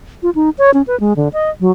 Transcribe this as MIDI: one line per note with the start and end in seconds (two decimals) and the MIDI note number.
0.23 0.30 65
0.35 0.50 63
0.58 0.71 73
0.74 0.82 61
0.87 0.99 71
1.00 1.13 56
1.16 1.28 50
1.33 1.50 75
1.60 1.71 54